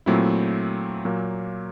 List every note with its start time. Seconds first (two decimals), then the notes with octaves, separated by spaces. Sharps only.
0.06 A#2 F#3 A3 C4 E4
1.05 A#2 F#3 A#3